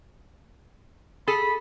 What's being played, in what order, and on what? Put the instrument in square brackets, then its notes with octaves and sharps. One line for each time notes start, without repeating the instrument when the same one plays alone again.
[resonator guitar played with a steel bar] G#4 [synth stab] A4 [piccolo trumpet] B5